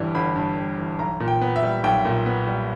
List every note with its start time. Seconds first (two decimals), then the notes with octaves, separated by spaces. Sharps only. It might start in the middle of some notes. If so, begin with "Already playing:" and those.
Already playing: G1 G2 E3 G3
0.15 G1 B5
0.36 G2
0.57 G3
0.78 E3
0.99 B1 A#5
1.20 A#2
1.28 G5
1.41 B3
1.56 E5
1.63 G3
1.84 B1 G5
2.05 A#2
2.26 B3
2.47 G3